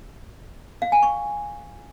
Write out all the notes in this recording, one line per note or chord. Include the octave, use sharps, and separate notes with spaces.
F5
G#5
C#6